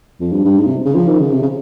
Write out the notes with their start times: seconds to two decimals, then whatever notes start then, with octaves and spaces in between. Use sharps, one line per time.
0.21 F2
0.32 G2
0.45 G2
0.58 G#2
0.66 C3
0.85 C#3
0.95 F3
1.08 D#3
1.20 C#3
1.32 C3
1.42 C#3